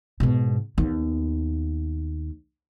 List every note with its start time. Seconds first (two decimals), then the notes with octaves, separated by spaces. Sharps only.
0.20 G#2 B2
0.78 D#2 B3